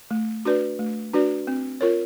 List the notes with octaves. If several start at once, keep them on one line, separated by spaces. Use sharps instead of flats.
A3
D4 F#4 B4 D5
A3
D4 F#4 B4 D5
C4
F4 A#4 C#5